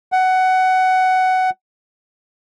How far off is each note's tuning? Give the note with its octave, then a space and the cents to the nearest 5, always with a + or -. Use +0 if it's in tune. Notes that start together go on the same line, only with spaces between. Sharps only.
F#5 +15